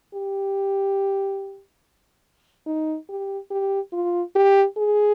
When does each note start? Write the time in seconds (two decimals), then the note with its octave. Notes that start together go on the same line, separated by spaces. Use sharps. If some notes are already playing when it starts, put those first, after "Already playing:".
0.14 G4
2.66 D#4
3.09 G4
3.51 G4
3.93 F4
4.35 G4
4.78 G#4